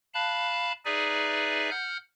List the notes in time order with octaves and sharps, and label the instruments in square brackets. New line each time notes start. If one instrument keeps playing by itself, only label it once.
[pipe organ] F5 A5 B5 F#6
D#4 G#4 B4 D5 E5 G#5
F#5 F6 G6